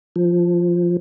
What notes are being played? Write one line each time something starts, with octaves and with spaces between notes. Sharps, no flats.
F3